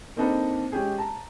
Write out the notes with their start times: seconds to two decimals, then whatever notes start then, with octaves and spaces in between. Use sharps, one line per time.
0.16 A#3 C4 D4 D#4 A4 B4
0.72 G#3 C#4 G4 G#4
0.98 A5 A#5